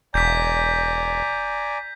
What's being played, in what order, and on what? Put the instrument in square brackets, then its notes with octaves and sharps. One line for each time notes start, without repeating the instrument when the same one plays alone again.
[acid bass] E1 [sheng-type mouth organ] D5 G#5 A#5 [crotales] G6 B6